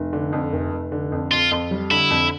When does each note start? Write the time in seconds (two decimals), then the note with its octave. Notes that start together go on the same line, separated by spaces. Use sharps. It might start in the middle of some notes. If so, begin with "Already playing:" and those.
Already playing: F1
0.13 D3
0.33 F2
0.53 F1
0.72 F1
0.92 D3
1.12 F2
1.31 F2 F4
1.51 F2
1.71 G3
1.91 D3 E4
2.10 F2